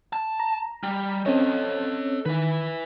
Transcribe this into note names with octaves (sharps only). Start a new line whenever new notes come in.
A5
A#5
G3
C4 C#4 A4 C#5 D#5
D#3 E4 B4